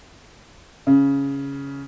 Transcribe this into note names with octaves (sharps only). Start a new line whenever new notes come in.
C#3